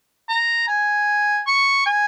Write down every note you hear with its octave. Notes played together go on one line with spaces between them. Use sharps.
A#5
G#5
C#6
G#5